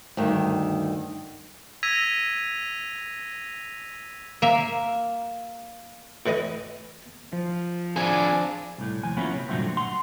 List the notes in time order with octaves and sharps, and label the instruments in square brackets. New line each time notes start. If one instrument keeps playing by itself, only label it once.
[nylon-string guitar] D2 G2 D#3
[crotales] E6 G#6 A#6 B6 D#7 F7
[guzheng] A#3 E5
[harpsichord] A2 E3 B4 D#5
[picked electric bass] F3
[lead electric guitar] C4 G#4 [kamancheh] D4 [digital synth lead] G#5
[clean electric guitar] C2 A2
D#2 F3 G#5
F3 F#3 A#3 B3 C#4 E4
C3
G2 A#2 D3 F#3 A3 C4
F#5 C6